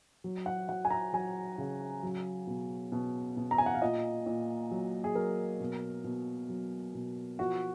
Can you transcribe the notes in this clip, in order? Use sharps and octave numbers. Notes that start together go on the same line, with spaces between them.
F#3
F#5
F#3 F#5
G#5
A#5
F#3 G#5
C#3
F#3
B2
B2
B2
A#5
G#5
F#5
F5
A#2 D#5
A#2
F#3
G#4
F#3 A#4
B2
B2
F#3
B2
F3 F#4